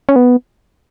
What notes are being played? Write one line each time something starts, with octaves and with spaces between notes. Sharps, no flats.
C#4
B3